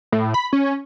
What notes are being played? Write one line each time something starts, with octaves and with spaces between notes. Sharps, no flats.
A2
B5
C#4